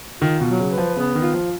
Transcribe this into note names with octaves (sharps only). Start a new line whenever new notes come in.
D#3 F4
B2
F#3
C#3
B4
F3
C#3 B3
D#3
F4
F3